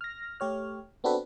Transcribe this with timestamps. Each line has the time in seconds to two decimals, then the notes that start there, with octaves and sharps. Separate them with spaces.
0.01 F6 A#6
0.40 A3 G4 C#5 F6
1.04 B3 C4 D4 F#4 A4 B4